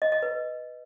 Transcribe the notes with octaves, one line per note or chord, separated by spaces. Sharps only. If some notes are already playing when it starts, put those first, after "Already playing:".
D#5
D#5
B4